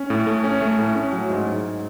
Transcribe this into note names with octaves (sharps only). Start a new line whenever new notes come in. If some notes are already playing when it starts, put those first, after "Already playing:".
Already playing: C#4
A2
A3
C#4
A3
A2
C#4
F#3
G#2
G#2